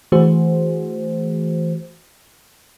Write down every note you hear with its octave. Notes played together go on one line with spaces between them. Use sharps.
E3 A3 F#4 G#4 C5